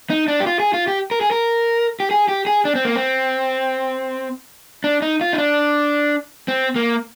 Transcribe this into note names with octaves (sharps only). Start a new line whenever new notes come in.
D#4
D4
G4
F4
G#4
F4
G4
A#4
G#4
A#4
G4
G#4
G4
G#4
D4
C4
A#3
C4
D4
D#4
F4
D#4
D4
C4
A#3